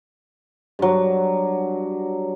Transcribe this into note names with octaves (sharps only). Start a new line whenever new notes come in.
G2 F#3